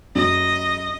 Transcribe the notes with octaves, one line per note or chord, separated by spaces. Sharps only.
F#2 D#5